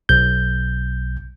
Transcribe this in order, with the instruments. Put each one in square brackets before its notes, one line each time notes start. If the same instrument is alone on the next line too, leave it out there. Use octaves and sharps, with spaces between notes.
[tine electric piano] B1 G6